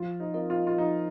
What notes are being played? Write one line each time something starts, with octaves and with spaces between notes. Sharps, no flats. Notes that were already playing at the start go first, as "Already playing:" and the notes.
Already playing: F3 F4
D#4
C4 F4 A#4 D#5
F4
F4
F3 D#4